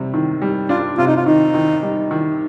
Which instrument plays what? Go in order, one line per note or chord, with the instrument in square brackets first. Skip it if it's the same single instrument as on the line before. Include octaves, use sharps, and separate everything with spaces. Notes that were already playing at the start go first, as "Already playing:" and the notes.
Already playing: [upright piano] C3 G3
D#3
G3
[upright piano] D4 [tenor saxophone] F4
[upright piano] C3 [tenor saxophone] F4
[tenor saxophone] D#4
F4
[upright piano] D#3 [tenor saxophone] D#4
[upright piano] D#3
G3
D#3